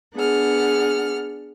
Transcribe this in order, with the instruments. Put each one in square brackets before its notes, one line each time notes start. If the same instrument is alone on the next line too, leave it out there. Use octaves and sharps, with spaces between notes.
[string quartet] B3 D4 G#4 F#5 F6